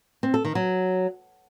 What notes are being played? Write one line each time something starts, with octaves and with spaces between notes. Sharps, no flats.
C4
A4
D#3
F#3